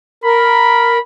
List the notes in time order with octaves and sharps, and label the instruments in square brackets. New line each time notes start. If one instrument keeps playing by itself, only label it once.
[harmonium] A#4 [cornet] B5